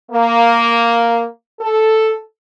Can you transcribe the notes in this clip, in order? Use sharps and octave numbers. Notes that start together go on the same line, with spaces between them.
A#3
A4